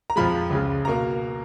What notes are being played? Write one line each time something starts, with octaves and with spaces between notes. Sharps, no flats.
A#5
F2 F3 G#3 B5
C#2 C#3 G#3
B2 A#3 A#5